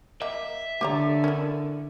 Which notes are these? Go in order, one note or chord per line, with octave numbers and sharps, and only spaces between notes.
A#3 D#5 E5
D3 G4 C#5 A#5
C#4 D4 E4 A#4